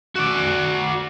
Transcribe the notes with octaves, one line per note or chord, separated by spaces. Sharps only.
F#4 D5